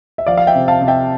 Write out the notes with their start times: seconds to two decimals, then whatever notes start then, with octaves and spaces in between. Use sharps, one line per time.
0.18 E5
0.27 F3 D5 F5
0.37 F5
0.47 E5 G5
0.55 C3
0.68 F5 A5
0.81 C3
0.88 E5 G5